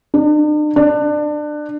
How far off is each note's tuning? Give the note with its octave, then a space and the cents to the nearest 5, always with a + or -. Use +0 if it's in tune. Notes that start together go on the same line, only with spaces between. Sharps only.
D4 +45
D4 +25